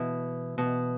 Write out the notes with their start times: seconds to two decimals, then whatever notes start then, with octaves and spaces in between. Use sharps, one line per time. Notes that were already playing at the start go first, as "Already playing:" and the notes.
Already playing: B2 E3 E4 F#4
0.58 B2